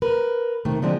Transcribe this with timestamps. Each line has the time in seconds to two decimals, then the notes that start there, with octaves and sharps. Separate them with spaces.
0.02 A#4 B4
0.65 C3 D#3 A3
0.82 D3 F3 G#3 C4 D4